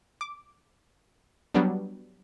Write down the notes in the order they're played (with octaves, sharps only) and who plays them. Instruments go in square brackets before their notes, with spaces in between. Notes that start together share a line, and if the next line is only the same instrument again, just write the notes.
[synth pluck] D6
F#3 G3 B3 D4